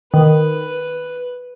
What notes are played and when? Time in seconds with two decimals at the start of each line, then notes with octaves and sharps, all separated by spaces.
0.14 D#3 B4